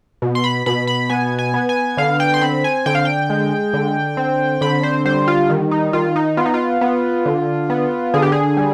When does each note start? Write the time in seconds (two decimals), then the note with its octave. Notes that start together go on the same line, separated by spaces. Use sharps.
0.22 B2
0.35 C6
0.44 B5
0.66 B2 B5
0.87 B5
1.10 B3 G#5
1.39 G#5
1.54 B3
1.69 G#5
1.97 D3 F5
2.20 G5
2.34 C6
2.41 C4 B5
2.64 G#5
2.86 D3 G5
2.95 F5
3.05 G5
3.30 G#3
3.74 D3
4.17 C4
4.61 D3 B5
4.83 C5
5.05 G3 C5
5.28 F4
5.50 D#3
5.71 D#4
5.93 D#3 F4
6.16 D#4
6.37 B3 F4
6.46 D#4
6.54 F4
6.81 B3
7.25 D3
7.70 B3
8.14 D3 G#4
8.22 G4
8.32 G#4
8.57 G3